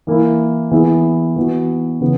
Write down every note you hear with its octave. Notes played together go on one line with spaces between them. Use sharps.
E3 A#3 E4
E3 B3 E4 G#4
E3 B3 F#4
C#3 E3 B3